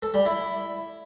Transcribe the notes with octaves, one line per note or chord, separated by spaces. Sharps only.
A4
G3
E4